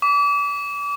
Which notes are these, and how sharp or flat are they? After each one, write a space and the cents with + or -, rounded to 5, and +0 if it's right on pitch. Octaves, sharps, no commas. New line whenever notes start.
D6 -35